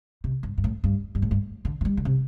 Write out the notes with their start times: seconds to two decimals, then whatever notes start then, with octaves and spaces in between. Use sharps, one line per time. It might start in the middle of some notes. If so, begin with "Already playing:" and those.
0.24 C3
0.43 G2
0.58 G2
0.64 A2
0.84 G2
1.15 G2
1.22 A2
1.31 G2
1.65 D3
1.81 F3
1.85 G3
1.97 D3
2.05 C3